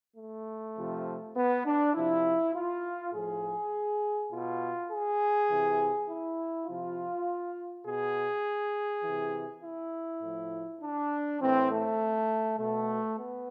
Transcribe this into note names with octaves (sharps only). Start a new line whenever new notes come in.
A3
C3 F3
B3
D4
C3 F3 E4
F4
A2 F3 G#4
B2 F4
G#4
C3 E3
E4
C3 F3 F4
B2 G#4
C3 E3
E4
A2 F3
D4
A2 E3 C4
A3
B2 A3
B3